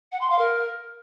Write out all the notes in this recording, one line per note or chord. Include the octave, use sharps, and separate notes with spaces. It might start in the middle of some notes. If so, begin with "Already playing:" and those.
F#5
C6
F5
A#4